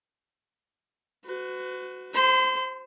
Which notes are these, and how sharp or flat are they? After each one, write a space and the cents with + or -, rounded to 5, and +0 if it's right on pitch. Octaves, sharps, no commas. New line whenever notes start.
F#4 +0 B4 +40
C5 +0 C6 -35